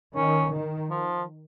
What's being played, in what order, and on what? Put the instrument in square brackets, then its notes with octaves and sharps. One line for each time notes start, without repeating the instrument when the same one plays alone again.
[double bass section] D#3 [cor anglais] C#4
[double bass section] D#3
[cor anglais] F3